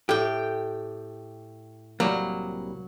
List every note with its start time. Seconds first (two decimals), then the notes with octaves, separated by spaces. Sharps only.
0.09 A2 G4 G5
2.00 C2 F#3 G3 A#3